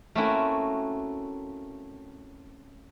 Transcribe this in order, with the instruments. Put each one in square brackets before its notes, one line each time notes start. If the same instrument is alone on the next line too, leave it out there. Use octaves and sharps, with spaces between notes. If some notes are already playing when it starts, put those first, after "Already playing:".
[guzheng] A3 A#3 C4 C#4 E4 F#4